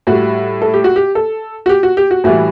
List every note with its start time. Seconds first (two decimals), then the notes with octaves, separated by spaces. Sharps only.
0.07 A2 G3 F#4
0.62 A4
0.74 G4
0.84 F#4
0.96 G4
1.15 A4
1.66 F#4
1.69 G4
1.83 F#4
1.97 G4
2.11 F#4
2.24 A2 E3 G3 F#4